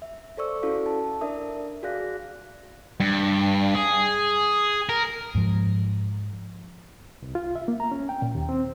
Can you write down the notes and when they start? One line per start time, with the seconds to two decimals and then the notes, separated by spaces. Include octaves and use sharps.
0.02 E5
0.37 A4 C5 D5 C#6 E6
0.62 C#4 E4 F#4 A4 D5 F5
0.86 A5
1.21 D4 A#4 D5 E5 D#6
1.83 F#4 G#4 D5 F5 F#6 A#6
3.00 G2
3.75 G#4
4.89 A#4
5.35 G#2 F3
7.22 C2
7.35 F4
7.55 E5
7.68 A#3
7.80 A#5
7.92 C#4
8.09 G5
8.22 A#2
8.35 D#2
8.49 C4